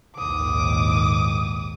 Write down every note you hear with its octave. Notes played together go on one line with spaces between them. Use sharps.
A#1 D#2 G#2 D6 D#6